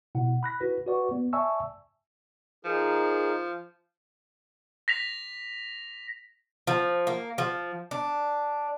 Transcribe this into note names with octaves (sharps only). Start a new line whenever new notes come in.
B2 E4 F#5
B5 F#6 A#6 B6
E4 F#4 B4
F#4 B4 D5 F#5 C#6
B3
D5 E5 G#5 A5 C#6 E6
F3 D#4 G#4 A#4
A#6 B6 F7
F3
A#3
F3
D4